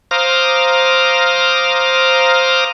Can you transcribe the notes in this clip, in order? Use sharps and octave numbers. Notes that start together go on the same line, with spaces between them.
C5 F5 A#5 D6 D#6 F6